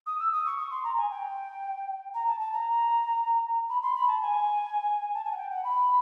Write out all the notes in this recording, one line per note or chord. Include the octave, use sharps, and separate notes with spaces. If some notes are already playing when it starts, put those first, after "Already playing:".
D#6
E6
D#6
C#6
C#6
C6
A#5
G#5
G5
A#5
A5
A5
A#5
B5
C6
B5
A5
G#5
A5
G#5
F#5
G5
F#5
B5